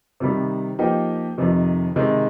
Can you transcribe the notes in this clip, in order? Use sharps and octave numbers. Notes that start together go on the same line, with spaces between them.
C3 D#3 G3
F3 A#3 D#4 G4
F2 C3 D#3
C3 D#3 G#3 D#4